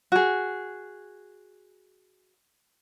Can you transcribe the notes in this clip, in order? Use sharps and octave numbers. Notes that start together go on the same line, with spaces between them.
F#4 G#4